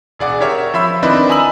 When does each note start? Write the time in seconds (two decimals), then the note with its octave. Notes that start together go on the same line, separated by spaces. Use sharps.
0.19 E1 G#4 D5 F#5 D6
0.40 G4 A#4 C#5 E5
0.74 F3 E5 B5 E6
1.02 D#3 C4 D4 E4 B4 D#5
1.29 G#5 A#5 B5 D#6 E6 F#7